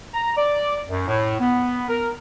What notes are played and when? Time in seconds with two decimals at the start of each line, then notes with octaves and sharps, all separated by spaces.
0.14 A#5
0.36 D5
0.88 F#2
1.07 A2
1.39 B3
1.88 A#4